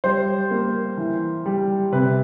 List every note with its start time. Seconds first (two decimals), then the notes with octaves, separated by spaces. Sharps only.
0.04 G3 C5
0.51 A#3
0.98 E3
1.46 G3
1.92 C3 B4